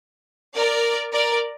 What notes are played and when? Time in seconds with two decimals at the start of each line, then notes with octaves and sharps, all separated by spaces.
0.55 A#4 D5
1.13 A#4 D5